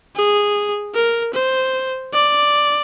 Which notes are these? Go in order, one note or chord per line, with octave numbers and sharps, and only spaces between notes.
G#4
A#4
C5
D5